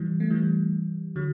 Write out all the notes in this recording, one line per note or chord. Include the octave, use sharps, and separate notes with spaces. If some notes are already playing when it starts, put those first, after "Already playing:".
Already playing: E3 G3
A3
E3 G3
D3 F#3